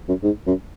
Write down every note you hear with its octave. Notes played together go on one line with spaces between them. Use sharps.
F#2
G#2
F#2